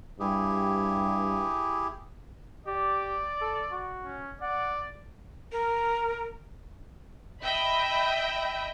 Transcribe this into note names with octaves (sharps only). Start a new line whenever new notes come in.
G2 E4 G4 G#4
G4 D5
A4
F#4
C#4
D5 F#5
A#4
D#5 E5 G5 B5